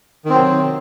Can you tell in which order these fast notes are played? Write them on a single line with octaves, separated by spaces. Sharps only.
D#3 C4 F#3 C3